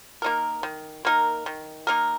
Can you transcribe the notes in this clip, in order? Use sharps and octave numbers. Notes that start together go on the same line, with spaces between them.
A#3 D#4 A#4
D#3
A#3 D#4 A#4
D#3
A#3 D#4 A#4